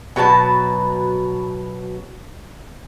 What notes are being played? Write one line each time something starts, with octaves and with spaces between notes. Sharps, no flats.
B2 F#3 B4 A5